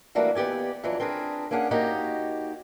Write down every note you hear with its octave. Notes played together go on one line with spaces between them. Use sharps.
E3 G3 A3 A#3 D4 F#4
D#2 B3 G4 D5 G#5
F2 E3 F#3 D4
C4 D4 G#4 A#4 B4
A#3 C#4 D4 G#4 F#5
A#3 D#4 F#4 G4 C#5 D#5